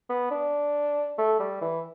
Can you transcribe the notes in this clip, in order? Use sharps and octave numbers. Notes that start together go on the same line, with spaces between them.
B3
D4
A3
G3
E3